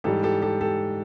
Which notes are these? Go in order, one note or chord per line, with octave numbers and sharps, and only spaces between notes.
G#2 E3 G3 G4 A4
G4 A4
G4 A4
G4 A4